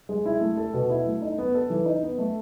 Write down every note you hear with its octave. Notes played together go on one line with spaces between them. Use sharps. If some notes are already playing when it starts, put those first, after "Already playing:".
G#3
E4
A3
A4
B2
E4
A3
D#4
B3
A4
E3
D#4
B3
A3